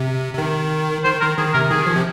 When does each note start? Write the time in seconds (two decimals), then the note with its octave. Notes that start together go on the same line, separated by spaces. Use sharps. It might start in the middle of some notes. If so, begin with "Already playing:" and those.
Already playing: C3
0.33 C3
0.38 D#3
1.04 D#3 C5
1.20 D#3 A#4
1.37 D#3 G#4
1.53 C3 A#4
1.70 D#3 G#4
1.86 F3
1.96 C3